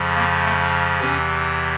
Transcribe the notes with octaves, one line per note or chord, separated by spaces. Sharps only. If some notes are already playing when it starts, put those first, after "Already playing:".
Already playing: F2 C#3 F3
A#3
A3
E2 C3 E3 C#4